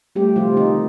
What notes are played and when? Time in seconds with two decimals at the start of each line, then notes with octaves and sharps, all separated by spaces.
0.16 G3 A3 G4
0.36 C3 F3 F4
0.56 D#3 F3 D#4